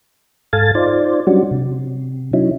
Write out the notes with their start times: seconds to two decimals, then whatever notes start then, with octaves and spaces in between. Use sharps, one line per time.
0.53 G#2 A4 F5 G#5 A6
0.75 D#4 F4 C5 D5
1.27 F#3 G3 C#4 D4 F#4
1.51 C3
2.33 F#3 C#4 D#4 E4